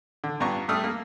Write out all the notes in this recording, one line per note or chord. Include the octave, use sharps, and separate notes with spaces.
D3
G2 B3 F4 A#5 C#6
G2 A3 D#6 F6
A#3